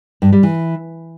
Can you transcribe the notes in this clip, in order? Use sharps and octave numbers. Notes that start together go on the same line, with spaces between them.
G2
G3
E3